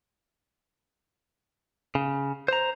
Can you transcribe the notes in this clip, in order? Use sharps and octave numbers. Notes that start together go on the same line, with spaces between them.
C#3
C5 A#5